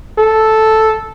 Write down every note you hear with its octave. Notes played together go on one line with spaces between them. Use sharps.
A4